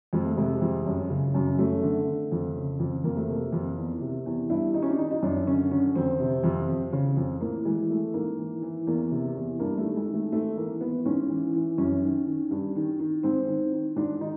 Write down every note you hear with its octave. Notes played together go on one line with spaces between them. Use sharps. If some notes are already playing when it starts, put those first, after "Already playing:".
F2 G#3
A3
C3 G#3
F2
F#2
C#3
F#2
F#2 A3
D3
D3
F2
C#3
F2
F2 A#3
A3
C3 A#3
F2
E2
C3
E2
G2 E4
D#3 D#4
C#4
D4
D#3 D#4
D#4
F#2 D4
D3 C#4
D3 C#4
F2 C4
C3
F2
F2
C#3
F2
A2 A#3
E3 G#3
E3 A3
G#2 A#3
E3
E3
E2 A#3
C3
E2
G2 A#3
A3
D#3
G#3
D#3
A3
G#2 A3
E3 A#3
E3 B3
G#2 C#4
E3
E3
F#2 C#4
D#3
D#3
G2
D#3
D#3
G#2 C4
D#3
D#3
G#2 D4
D#3 D#4